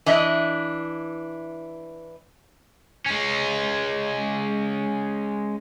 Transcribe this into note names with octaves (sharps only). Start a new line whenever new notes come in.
E3 D4 D#5 E5
G#3 C#4